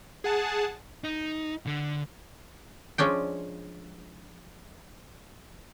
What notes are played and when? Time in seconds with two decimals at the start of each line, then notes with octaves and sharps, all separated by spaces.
0.24 G#4 F#5 A5
1.04 D#4
1.67 D3
2.98 F3 G#3 C#4 D4 G5